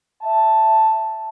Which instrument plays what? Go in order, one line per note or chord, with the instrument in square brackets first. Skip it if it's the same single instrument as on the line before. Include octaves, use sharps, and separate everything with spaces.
[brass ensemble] E5 A5